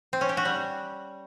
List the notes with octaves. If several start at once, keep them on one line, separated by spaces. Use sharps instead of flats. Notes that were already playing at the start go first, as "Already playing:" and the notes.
C4
C#4
G4
F#4
G3